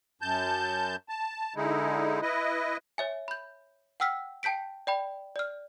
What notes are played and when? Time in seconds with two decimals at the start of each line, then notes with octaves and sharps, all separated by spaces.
0.22 F#2 A5 G6
1.09 A5
1.56 D3 G#3 D#4 E4
2.22 E4 B4 D#5
2.98 C#5 E5 G#5
3.28 B5 G6
4.00 F#5 G5 E6 F6 B6
4.43 G5 A5 G6 B6 D7
4.87 D5 G5 B5
5.36 D5 F6